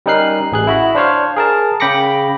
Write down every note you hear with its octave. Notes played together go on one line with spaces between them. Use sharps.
G3 C#4 D#4 A#4 F#6 C7
A1 G#4 F#6
E4 F#4 B5
D4 C5 C#5 F5
G#4 A#4 A5
C#3 G5 B5 D6 A#6 C#7